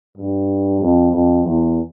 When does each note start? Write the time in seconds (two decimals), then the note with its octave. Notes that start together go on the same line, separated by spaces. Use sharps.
0.18 G2
0.81 F2
1.12 F2
1.44 E2